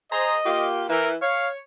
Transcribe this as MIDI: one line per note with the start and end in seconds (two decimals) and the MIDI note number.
0.12 0.36 68
0.12 0.36 72
0.12 0.68 75
0.12 0.36 82
0.46 0.85 58
0.46 0.85 65
0.46 0.85 67
0.90 1.15 52
0.90 1.11 70
1.22 1.59 73
1.22 1.49 77